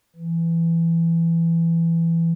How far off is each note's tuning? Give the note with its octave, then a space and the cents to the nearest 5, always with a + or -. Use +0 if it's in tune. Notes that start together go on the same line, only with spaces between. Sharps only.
E3 +15